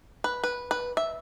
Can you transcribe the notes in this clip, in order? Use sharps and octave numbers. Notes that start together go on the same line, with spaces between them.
B4
B4
B4
E5